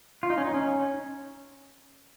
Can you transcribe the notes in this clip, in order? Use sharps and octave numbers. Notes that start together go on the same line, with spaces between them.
F4
D#4
C#4
D#4
C#4